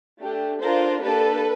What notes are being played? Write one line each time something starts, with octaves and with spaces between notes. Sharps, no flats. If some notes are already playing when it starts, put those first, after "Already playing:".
A3 D4 G4
D4 F4 A4 A#4 C5
A#3 D4 G4 A4 B4